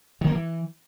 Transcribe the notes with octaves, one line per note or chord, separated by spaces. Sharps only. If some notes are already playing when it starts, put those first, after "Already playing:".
D#3
A#3
E3